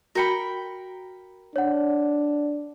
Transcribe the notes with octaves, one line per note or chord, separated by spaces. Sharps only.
F#4 A#4 G5 B5 C#7
D4 C#5 F#5